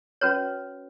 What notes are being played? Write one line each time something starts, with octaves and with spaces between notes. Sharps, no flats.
C#4 F#4 B4 C#5